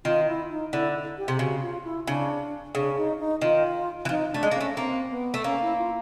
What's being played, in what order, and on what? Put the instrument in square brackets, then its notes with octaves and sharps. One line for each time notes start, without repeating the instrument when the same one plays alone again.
[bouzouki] D#3 [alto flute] F4
[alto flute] E4
D#4
[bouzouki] D3 [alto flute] E4
[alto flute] G4
[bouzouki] C3
[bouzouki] C#3 [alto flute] F#4
[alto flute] F4
E4
[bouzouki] C#3 [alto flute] D4
[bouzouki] C#3 [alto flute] D4
[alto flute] D#4
D#4
[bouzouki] D#3 [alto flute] F4
[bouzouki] E3
[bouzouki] F3 [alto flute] D#4
[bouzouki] A3 [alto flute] D4
[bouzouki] G#3
[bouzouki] A#3 [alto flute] C#4
[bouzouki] A3
[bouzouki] A#3 [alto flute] C4
[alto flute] B3
[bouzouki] A3
[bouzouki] A#3 [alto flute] C#4
[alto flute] E4
F4